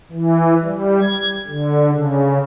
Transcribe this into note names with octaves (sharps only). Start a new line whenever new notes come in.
E3
G3
G#6
D3
C#3